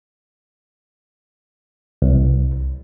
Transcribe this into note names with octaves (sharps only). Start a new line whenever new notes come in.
C2